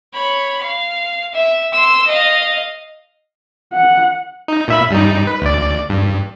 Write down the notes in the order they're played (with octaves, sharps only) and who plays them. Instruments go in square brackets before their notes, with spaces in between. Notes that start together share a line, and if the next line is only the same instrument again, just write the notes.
[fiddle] C#5 B5
F5
E5
C6 E6
D#5 F5
[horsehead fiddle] F#5
[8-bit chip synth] D#4
A#2 E5 B5
G2 G3 D#4
B4
D2 D5
G2